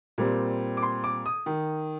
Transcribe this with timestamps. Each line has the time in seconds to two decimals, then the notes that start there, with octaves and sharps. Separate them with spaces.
0.18 A#2 G3 C4
0.77 D6
0.83 C6
1.04 D6
1.26 D#6
1.46 D#3